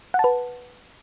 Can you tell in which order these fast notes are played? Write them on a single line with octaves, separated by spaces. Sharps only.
F#5 A5 B4